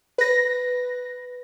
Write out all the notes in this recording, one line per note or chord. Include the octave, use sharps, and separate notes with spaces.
B4 A#6